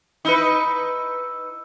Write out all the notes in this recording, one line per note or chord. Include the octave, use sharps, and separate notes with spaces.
D#4 E4 B4